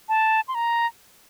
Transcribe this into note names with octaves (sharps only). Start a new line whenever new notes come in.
A5
C6
A#5